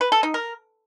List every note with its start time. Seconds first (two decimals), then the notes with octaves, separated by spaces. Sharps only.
0.01 B4
0.12 A4
0.23 D#4
0.34 A#4